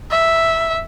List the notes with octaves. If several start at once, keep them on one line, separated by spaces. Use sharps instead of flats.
E5